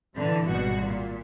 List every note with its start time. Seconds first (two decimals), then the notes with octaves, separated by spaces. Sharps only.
0.14 A#2 D3 E3
0.45 G#1 B2 G3 F#4
0.78 A#2